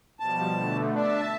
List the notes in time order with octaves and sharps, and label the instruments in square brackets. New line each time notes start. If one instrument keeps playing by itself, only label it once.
[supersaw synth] B2 F3 G3 [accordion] A5
[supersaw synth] B2 D3 A3
[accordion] D4 [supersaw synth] E5 A5